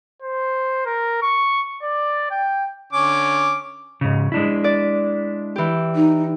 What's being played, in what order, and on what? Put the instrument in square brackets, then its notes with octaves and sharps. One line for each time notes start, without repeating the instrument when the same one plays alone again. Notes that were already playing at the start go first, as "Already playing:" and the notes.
[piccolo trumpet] C5
A#4
C#6
D5
G5
[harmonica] D3 C#4 D6
[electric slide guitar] G#2 C#3
G#3 D4 E4
[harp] D5
E3 G4
[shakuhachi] D#4